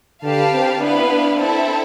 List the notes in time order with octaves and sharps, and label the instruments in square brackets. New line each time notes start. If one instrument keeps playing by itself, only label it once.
[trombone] D3 [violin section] G4 B4 F5 A5
[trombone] C4
[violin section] B3 E4 B4 F5 [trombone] D4
[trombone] D4
[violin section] C4 E4 A4 E5